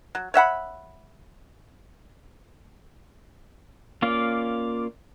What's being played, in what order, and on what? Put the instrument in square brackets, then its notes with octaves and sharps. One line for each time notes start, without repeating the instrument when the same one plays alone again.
[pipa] F#3
C#5 E5 F#5 B5
[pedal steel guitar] A#3 C#4 F4 D5 F5